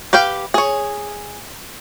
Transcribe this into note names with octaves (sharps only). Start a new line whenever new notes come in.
G4 B4 F5 G5
G#4 C#5